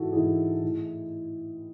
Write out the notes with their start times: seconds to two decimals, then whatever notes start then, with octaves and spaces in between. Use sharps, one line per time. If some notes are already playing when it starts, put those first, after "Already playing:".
Already playing: G#2 E3 F#4 A4
0.12 G#2 E3 G#4
0.62 A2 E3